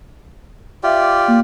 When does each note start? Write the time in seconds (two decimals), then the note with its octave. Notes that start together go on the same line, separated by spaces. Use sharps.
0.83 F4 G4 D5 E5
1.28 A#3